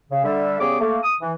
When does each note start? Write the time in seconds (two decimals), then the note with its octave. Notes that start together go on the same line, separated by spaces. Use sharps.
0.10 C#3
0.24 D3 G3 E5
0.60 C#3 G3 B3 G#4 C#5 D6
0.80 A3 A#3
1.03 D#6
1.21 E3